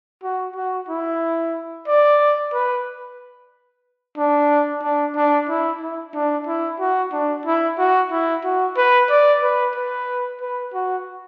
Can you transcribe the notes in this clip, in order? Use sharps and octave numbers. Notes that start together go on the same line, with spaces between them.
F#4
F#4
E4
D5
B4
D4
D4
D4
E4
E4
D4
E4
F#4
D4
E4
F#4
E4
F#4
B4
D5
B4
B4
B4
F#4